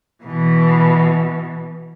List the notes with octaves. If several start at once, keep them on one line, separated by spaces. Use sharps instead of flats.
B2 E3